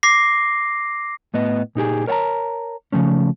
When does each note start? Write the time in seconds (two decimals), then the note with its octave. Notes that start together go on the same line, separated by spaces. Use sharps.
0.03 D6 A#6 C7
1.34 A2 B3 D#5
1.75 A#2 D#4 G4 G#4
2.07 A#4 C#5 E5 F#5 A5 A#5
2.92 C#3 F3 A3 C#4